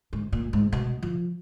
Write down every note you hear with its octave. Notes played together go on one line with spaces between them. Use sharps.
G#2
A#2
G#2
B2
F3